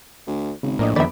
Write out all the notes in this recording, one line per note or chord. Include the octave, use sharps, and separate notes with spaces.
D2
G#1 C#3
A#1 A2 A#4 D5 D#5
F2 D#3 B3 D5 E5 B5